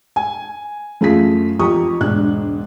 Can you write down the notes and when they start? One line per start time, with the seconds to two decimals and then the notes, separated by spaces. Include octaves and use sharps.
0.16 G#5
1.01 F#2 A3 F4 G#4 B6
1.59 F2 F3 G4 A#5 C#6 D#6
2.01 E1 G#2 D4 F#6